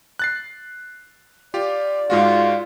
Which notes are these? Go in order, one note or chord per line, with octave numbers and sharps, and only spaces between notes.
F#6 A6 C7
F4 G4 D5
G#2 G#3 F4 F#4